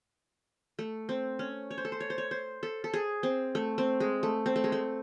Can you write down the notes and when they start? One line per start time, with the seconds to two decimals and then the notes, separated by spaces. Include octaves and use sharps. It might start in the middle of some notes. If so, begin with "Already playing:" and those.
0.79 A3
1.09 C4
1.39 C#4
1.71 C#5
1.78 C5
1.85 A4
1.92 C5
2.00 C#5
2.10 C5
2.18 C#5
2.31 C5
2.63 A4
2.84 A4
2.93 G#4
3.23 C4
3.55 A3
3.78 C4
4.00 G#3
4.23 A3
4.46 C4
4.56 A3
4.64 G#3
4.72 A3